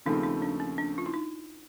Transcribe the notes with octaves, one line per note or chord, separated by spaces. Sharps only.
D#2 C#3 F3 A3 C4 D#4
D#4
D4
C#4
D4
F4
E4
D#4